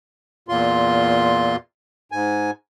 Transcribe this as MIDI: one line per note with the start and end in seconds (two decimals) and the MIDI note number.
0.48 1.56 40
0.48 1.56 46
0.48 1.56 65
0.48 1.56 84
2.12 2.51 44
2.12 2.51 80